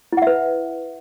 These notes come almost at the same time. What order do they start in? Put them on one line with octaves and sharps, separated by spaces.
E4 F#5 E5 B4